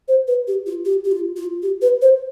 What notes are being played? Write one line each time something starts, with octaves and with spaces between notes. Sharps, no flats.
C5
B4
G4
F4
G4
G4
F4
F4
G4
B4
C5